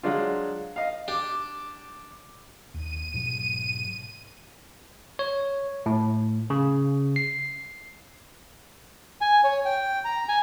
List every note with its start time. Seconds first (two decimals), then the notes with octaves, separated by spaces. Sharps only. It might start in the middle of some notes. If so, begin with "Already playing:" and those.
0.03 F#3 G#3 D4 F4
0.76 D#5 F5
1.08 D4 G4
2.74 D#2 D#7
3.14 G#2 B2 F#3
5.19 C#5
5.86 A2
6.50 C#3
7.16 C7
9.21 G#5
9.44 C#5
9.65 G5
10.05 A#5
10.29 G#5